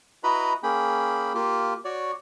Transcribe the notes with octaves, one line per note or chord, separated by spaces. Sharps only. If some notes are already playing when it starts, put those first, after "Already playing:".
E4 F#4 B4 D#5 A#5 B5
A#3 C#4 G#4 G5 B5
A#3 F4 G4
F#4 C#5 D5